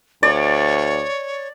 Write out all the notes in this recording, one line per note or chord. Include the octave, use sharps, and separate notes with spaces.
D2 C#5 D5